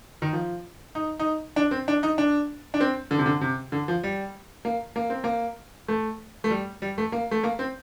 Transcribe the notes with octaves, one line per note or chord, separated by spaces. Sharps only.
D#3
F3
D#4
D#4
D4
C4
D4
D#4
D4
D4
C4
D3
C3
D3
C3
D3
F3
G3
A#3
A#3
C4
A#3
A3
A3
G3
G3
A3
A#3
A3
A#3
C4